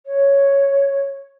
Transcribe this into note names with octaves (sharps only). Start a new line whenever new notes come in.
C#5